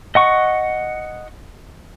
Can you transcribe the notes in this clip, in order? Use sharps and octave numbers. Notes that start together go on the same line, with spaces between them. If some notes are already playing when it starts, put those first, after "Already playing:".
D#5 F#5 C#6